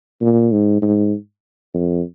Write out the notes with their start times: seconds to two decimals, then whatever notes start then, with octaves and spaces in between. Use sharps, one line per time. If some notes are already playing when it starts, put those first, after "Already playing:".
0.21 A#2
0.52 G#2
0.82 G#2
1.74 F2